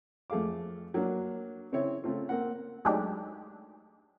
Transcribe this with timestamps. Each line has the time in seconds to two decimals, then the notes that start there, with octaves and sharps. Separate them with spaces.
0.30 F2 A3 G#4 F5 D6
0.94 F#3 A#3 D4
1.72 C#3 C4 E4 C#5
2.04 C#3 A3 C4 F4
2.29 A#3 C4 A#4 F#5
2.85 F#3 G#3 A3 D4 D#4 G4